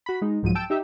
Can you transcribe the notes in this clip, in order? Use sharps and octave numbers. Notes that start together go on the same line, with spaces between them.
F#4 B5
G#3 D#4
C2 G#2 F3 F#3 D#7
G5 A5 E6 D7
D#4 G4 E5